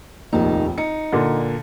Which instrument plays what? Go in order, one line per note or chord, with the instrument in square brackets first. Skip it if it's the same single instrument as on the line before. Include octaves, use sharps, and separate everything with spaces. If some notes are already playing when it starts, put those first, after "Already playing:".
[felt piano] F1 A#1 D#2 [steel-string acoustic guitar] D#3 D#4
[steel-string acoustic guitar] D#4 [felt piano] C#7
[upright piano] A#2 D3